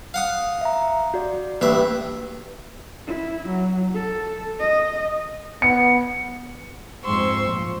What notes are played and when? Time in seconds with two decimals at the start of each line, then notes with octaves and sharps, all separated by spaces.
0.14 F5 F#5 D#6
0.61 E5 A#5
1.14 F#4 D5
1.61 A1 G2 A#3 E5
3.07 E4
3.49 F#3
3.94 A4
4.60 D#5
5.62 B3 C#7
7.03 F2 G#2 C5 C6 C#6 E6
7.48 A#2 F3